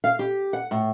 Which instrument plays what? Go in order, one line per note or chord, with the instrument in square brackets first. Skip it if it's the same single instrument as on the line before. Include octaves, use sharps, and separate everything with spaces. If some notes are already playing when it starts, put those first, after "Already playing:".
[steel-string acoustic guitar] F5
G4
F#5
A2